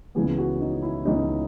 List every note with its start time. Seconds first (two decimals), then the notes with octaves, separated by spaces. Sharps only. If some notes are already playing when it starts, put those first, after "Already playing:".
0.15 C#2 C#3 E3 B3 G#4
0.38 F#4
0.60 D#4
0.82 E4
1.05 C#2 C#3 E3 B3 D#4